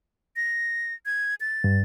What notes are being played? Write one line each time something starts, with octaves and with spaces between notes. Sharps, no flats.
A#6
G#6
A6
G2